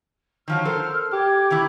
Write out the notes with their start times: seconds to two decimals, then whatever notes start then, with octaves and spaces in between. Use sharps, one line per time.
0.48 D#3 F3 F#3 F6
0.65 A4 A#4 C5
1.13 G4 D6 G#6
1.50 D#3 E3 E4